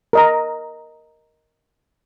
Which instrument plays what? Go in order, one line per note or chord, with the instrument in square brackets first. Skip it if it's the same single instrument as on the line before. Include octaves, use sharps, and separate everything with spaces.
[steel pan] A#4 D#5 A#5